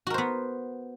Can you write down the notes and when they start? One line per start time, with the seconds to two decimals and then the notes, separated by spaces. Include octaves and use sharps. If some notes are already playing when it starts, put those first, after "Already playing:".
0.07 F#4
0.10 A#4
0.14 C5
0.18 B3